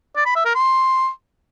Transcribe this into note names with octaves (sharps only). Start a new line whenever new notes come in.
D5
B5
E5
A#4
C6